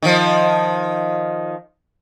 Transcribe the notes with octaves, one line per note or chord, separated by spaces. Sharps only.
D#3 F3